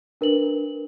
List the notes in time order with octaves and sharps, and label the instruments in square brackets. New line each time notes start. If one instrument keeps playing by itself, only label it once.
[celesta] D4 A#4 B4 F#7